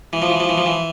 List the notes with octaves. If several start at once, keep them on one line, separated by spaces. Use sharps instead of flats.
E3
F3
E3
F3
E3
F3
E3